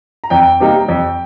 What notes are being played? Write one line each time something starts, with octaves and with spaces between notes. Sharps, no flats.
A#5
F2 G5
C3 G3 A#3 D#4
F2